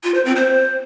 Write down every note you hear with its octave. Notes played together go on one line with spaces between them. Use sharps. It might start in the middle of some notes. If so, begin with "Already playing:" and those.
F4
C5
C4
C5